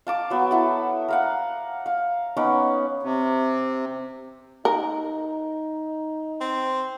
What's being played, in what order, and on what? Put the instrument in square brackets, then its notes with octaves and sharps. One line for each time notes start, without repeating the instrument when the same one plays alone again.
[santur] F5 A5 D6
F#3 B3
E4 A4
A#4 F5 F#5
F5
B3 C#4 D#4 D6
[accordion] C3
[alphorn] D#4 [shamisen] A#4
[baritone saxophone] C4